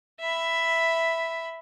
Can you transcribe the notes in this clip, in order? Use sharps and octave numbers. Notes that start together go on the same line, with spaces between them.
E5 B5